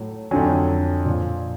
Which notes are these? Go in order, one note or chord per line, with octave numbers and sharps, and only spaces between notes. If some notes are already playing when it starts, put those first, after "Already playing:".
Already playing: A2 F#3
F2 D3 F#3 G#5
A#2 F3